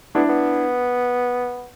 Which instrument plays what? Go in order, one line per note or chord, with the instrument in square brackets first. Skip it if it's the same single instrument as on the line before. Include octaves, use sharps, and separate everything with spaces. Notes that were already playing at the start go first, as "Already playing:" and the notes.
[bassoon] B3 [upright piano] D4 E4
[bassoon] B3